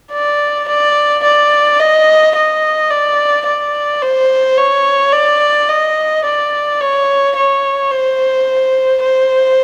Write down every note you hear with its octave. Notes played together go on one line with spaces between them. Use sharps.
D5
D5
D5
D#5
D#5
D5
D5
C5
C#5
D5
D#5
D5
C#5
C#5
C5
C5